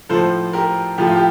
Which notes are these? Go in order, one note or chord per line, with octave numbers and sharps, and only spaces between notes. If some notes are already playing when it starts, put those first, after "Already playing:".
A2 F3 A4 C5
G4 A#4
A2 F3 G4
F4
G4